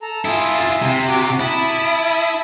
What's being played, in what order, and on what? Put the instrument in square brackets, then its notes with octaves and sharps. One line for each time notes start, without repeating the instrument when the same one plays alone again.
[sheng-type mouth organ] A4 A#5
[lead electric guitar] E4 F4 [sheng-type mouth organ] E5 G#5 D#6
[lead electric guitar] C3
[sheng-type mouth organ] F#4 D6
[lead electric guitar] E4 [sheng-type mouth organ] A5 B5 D#6